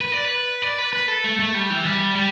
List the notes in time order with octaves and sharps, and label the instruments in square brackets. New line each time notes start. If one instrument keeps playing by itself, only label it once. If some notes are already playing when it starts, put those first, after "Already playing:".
[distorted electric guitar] B4
D5
B4
D5
B4
B4
A4
A3
A3
G3
E3
G3
G3